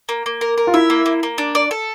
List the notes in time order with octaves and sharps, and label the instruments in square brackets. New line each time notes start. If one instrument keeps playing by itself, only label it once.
[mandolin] A#3
A#3
A#4
A#4
[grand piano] F4
[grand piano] E4 [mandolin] E5
[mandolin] A#3
A#3
A#3
D4
D5
A4